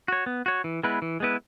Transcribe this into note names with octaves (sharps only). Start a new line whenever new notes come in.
F#4 C#5
B3
F#4 C#5
E3
G#3 B3 E4 B4
E3
G#3 B3 E4 B4